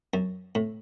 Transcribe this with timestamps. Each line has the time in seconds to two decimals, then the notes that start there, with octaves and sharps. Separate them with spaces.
0.14 F#2
0.55 A2